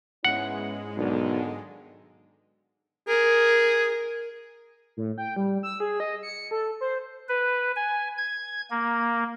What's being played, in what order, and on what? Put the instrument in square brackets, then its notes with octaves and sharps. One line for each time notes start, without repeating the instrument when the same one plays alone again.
[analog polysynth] G#2 G#3 [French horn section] B3 C#4 E4 [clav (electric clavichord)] F#5
[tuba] B1 [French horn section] D3 D#3
[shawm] G#4 [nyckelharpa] A#4
[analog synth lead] A2
G5
G3
E6
G#4
D#5
C#7
A4
C5
[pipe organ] B4
G#5
G#6
A#3